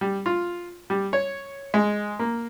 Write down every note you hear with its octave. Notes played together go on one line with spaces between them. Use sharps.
G3
F4
G3
C#5
G#3
A#3